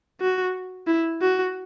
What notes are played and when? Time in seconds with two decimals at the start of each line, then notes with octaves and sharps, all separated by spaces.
0.21 F#4
0.87 E4
1.21 F#4